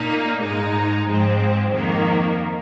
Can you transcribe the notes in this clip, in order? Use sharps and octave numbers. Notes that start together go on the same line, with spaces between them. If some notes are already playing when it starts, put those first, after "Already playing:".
Already playing: A#2 A#3 D#4
G#2 G#3 D#4
G#2 F3 G#3 C4
F2 D#3 A#3